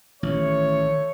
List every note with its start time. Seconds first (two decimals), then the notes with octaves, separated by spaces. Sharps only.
0.23 A1 D#3 A3 C#5